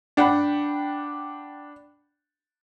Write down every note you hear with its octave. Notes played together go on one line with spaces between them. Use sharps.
D4 F#5 G5 B5